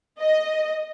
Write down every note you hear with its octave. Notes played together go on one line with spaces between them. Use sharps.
D#5